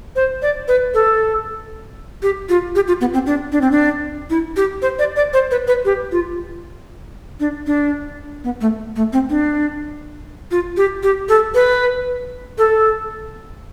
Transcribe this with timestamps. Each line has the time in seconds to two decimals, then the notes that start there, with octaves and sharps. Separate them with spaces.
0.16 C5
0.42 D5
0.68 B4
0.94 A4
2.23 G4
2.49 F4
2.75 G4
2.87 F4
3.01 B3
3.14 C4
3.26 D4
3.52 D4
3.61 C4
3.71 D4
4.30 E4
4.57 G4
4.82 C5
4.99 D5
5.16 D5
5.33 C5
5.51 B4
5.68 B4
5.85 G4
6.12 F4
7.40 D4
7.67 D4
8.44 B3
8.61 A3
8.96 A3
9.13 C4
9.30 D4
10.51 F4
10.77 G4
11.03 G4
11.29 A4
11.55 B4
12.58 A4